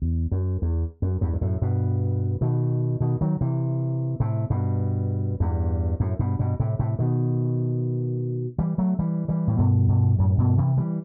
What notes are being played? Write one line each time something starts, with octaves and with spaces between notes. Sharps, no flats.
E2
F#2
E2
F#2
E2 G2
G2
F#2 A2
G2 B2
B2 D#3
B2 D#3
D#3 F#3
C3 E3
A2 C3
G2 B2
E2 G2
F#2 A2
G2 B2
G2 B2
A2 C3
A2 C3
B2 D#3
E3 G3
F#3 A3
E3 G3
E3 G3
A2
G2 B2
G2 B2
F#2 A2
G2 B2
C3 E3
E3 G3